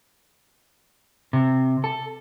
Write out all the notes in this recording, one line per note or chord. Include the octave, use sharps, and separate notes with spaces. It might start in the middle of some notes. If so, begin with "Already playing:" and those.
C3
A4